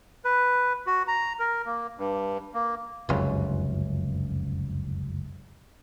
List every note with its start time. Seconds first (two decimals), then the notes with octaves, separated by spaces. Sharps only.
0.25 B4
0.87 F#4
1.08 A#5
1.39 A#4
1.66 A#3
1.98 G2
2.54 A#3
3.09 F1 C#2 F#2